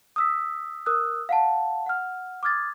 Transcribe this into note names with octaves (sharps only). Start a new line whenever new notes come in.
D#6 E6 B6
A#4 D#6 E6 F#6
F5 F#5 A5
F#5 F6
D6 D#6 F6 G#6 A6